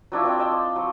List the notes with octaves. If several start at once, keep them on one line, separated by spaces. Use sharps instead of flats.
F#3 D4 E4 F4
C4 D5 G5
C5 D#5 G5 A5
D5
F#3